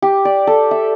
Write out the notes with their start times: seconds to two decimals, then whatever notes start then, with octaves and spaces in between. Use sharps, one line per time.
0.02 G4
0.25 D5
0.47 A4
0.71 E5